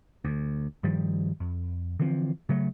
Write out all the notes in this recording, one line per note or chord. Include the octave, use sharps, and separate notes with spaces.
D2
G2 D#3 F3 G3
F2
D3 E3 F3 C4
C#3 F#3 A3